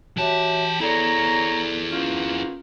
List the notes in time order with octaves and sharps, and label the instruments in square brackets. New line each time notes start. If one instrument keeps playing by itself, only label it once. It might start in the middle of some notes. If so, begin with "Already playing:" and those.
[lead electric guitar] E3 A5 [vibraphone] F#4 C#5 E5 [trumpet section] G4
[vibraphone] B3 A4 D5 [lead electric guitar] E4 G#4 [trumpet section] C#5 A#5
[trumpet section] A#3 B3 C5 [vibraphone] C#4 F4